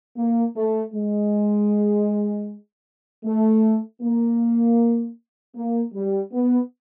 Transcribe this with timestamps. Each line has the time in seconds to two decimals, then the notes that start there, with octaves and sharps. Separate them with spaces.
0.17 A#3
0.56 A3
0.94 G#3
3.25 A3
4.02 A#3
5.56 A#3
5.94 G3
6.32 B3